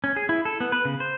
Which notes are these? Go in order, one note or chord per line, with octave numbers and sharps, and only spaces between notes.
C#4
G#4
E4
A4
B3
B4
C#3
C5